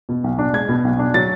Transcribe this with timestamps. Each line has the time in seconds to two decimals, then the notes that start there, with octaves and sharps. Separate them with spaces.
0.09 B2
0.24 B1
0.39 D4
0.53 G#3 G#6
0.69 B2
0.85 B1
0.99 D4
1.14 F#3 A6